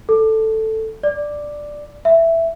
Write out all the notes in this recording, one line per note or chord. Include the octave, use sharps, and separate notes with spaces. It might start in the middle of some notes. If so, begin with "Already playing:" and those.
A4
D5
E5